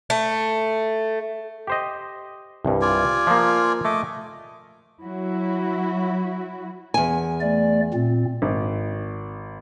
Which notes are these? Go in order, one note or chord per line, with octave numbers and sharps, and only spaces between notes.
A3
G4 C5 D#5
C2 G2
F4 D5 G#5
F3 A#3
A3 D#5 D6
F#3 E4 F#4
E2 G#5
A3 D5
A#2 C4
G#1